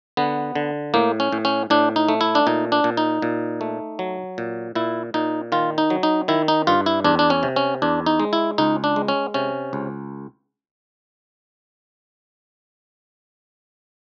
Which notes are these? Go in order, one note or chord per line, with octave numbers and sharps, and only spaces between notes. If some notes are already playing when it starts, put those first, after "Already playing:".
D3 B3
D3
A2 A#3
C#4
A2
C#4
A2 D4
D#4
A3
E4
D4
A#2 D#4
D4
A#2
D#4
A#2
A3
F#3
A#2
A#2 E4
A#2 D#4
D#3 F4
D#4
F#3
D#4
D#3 E4
D#4
G2 F4
E4
E2 D4
D4
C#4
C3
C#4
E2 D4
D#4
G#3
E4
C#2 D#4
D4
G#3
C#4
C3 C#4
C#2